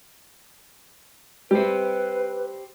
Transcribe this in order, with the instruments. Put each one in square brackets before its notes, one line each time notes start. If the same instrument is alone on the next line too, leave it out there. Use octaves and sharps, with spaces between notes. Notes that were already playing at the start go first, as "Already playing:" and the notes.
[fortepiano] G3 [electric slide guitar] G4 C5 [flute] B4